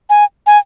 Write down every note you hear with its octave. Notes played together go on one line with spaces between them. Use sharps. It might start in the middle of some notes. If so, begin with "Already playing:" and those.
G#5
G#5